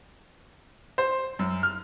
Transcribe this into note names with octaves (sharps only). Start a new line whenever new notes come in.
C5
F#2
F6